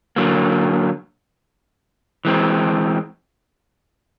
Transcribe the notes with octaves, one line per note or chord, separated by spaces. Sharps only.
D3 F#3 A#3
E3 G#3 C4